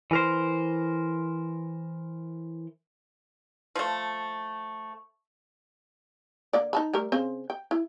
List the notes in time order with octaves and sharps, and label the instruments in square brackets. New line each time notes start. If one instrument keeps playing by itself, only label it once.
[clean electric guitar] E3 A#4 C5
[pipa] F3 A3
[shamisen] D3 A#3 D5
D#4 A5 B5
G3 A3 A#4
C#3 C4 C5
G5
E4